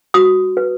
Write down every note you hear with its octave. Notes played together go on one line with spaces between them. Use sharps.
F#4 D#6
B4